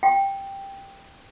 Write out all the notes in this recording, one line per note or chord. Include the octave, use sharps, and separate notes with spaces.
G5